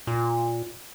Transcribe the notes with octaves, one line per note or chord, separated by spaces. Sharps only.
A#2